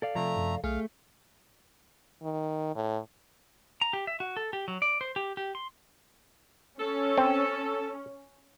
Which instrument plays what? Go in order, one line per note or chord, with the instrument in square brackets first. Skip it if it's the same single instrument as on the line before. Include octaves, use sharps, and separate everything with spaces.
[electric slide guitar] A4 D5 F5
[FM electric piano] C3 F3 [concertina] A3 A#5
[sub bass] F#2
[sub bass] B1 [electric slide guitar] A3 [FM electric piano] G#4 [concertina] F5
[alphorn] D#3
A2
[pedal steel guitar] A#5
G4
E5
F#4
A4
G4
F#3
D5
C5
G4
G4
C6
[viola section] C#4 [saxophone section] A4
[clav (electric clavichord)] C4